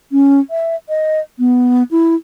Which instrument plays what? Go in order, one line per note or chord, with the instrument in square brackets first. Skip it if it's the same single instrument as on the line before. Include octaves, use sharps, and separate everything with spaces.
[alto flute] C#4
E5
D#5
B3
E4